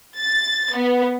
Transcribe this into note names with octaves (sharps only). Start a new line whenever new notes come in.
A6
B3